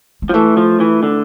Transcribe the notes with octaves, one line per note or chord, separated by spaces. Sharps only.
G#3
F3
E3 A3
F3
E3
D3